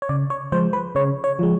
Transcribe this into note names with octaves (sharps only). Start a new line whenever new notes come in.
C#5
C#3 D5
C#5
F3 G#3 C5
B4
C#3 C#5
C#5
F3 G#3